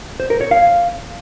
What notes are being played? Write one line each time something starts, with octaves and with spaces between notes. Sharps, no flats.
C5
A#4
C#5
F5